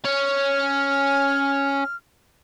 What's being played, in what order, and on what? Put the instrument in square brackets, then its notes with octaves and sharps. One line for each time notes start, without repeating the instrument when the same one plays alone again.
[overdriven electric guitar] C#4 [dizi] F6